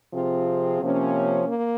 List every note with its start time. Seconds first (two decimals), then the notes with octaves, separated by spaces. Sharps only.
0.13 C3 F3 C4 F4 G#4
0.81 C3 F3 A#3 C#4
1.48 A#3